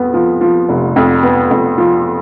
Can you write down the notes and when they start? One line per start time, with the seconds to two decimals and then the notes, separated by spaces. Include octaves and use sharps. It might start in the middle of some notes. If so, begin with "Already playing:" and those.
Already playing: F2 B3
0.14 F3
0.41 F3
0.69 F1
0.96 F2
1.23 B3
1.51 F2
1.78 F3